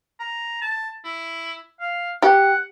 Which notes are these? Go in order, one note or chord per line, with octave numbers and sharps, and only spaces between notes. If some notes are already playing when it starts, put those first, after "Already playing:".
A#5
A5
E4
F5
G4 F#5